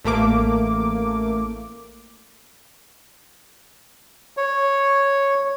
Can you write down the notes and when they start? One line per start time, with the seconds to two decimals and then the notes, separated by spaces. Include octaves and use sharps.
0.04 A1 A3 A#3 D6
4.37 C#5